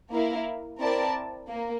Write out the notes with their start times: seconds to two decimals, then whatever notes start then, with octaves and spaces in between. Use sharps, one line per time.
0.12 A#3 E4 A#4 F5
0.80 C4 E4 A#4 D5 A5
1.49 A#3